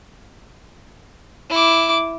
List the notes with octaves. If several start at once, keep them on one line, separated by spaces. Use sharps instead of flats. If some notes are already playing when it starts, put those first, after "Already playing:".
E4 D6